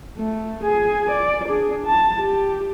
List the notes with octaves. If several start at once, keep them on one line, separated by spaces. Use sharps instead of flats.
A3
G#4 G#5
D5
D4 G#4
A5
G4